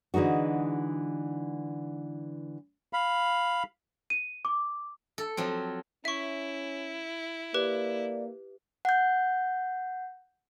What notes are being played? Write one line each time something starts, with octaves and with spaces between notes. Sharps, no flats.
D3 E3 G#3 D#4 F#4
F5 B5
D#7
D6
A4
F3 F#3 C4
C#4 E4 E5 C#6
A#3 G4 B4 D5
F#5 G6